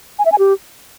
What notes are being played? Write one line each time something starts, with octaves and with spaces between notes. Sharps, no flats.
G#5
E5
G#5
G4